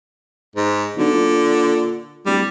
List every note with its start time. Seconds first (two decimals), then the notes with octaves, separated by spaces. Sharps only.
0.55 G#2
0.97 B1 D3
1.13 A#2
2.26 D1 G3